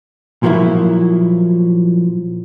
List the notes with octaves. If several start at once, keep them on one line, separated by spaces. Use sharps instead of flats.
A#2 F3 F#3 A#3 E4